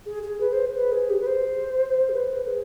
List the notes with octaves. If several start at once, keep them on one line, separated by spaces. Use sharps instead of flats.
G#4
G#4
B4
C5
B4
G#4
G4
B4
C5
G#4
B4
G#4